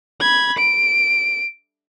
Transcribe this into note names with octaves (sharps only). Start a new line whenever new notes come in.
B5 G#6
D7